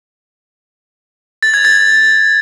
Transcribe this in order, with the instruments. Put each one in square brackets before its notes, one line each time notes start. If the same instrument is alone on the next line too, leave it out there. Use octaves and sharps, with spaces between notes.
[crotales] A6
G#6
A6